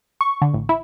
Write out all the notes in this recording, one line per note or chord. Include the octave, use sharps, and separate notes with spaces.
C#6
D3
A1
E4